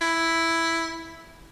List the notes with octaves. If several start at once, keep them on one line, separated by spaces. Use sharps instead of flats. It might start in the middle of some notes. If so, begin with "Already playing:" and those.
E4